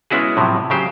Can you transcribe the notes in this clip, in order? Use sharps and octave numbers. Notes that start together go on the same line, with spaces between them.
G#3 B3 C#4 E4 F#4 G#4
A2 C3 F3 F#3
C#3 F#3 G4 C5